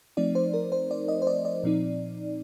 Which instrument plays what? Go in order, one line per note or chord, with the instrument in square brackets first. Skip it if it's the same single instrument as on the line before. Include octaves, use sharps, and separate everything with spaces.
[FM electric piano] F3 A3 C4 D#4 D5
C5
A#4
C5
D5
D#5
C5
D5
D5
A#2 F3 C4 D#4